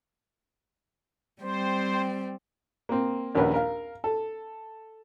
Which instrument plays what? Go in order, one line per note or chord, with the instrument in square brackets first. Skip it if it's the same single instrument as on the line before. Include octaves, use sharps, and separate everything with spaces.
[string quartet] G3 C4 [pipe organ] C5
[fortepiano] A#3 C4
A#1 D#2 C#4 A#4 B4 F#5
A#4 F5
A4